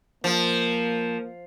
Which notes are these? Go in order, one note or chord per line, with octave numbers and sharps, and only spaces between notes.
F3 A#3